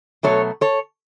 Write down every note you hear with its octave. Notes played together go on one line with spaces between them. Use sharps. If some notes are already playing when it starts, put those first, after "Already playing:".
B2 F#3 A3 A4 C#5
A4 C#5